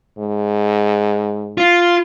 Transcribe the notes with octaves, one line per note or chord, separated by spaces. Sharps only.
G#2
F4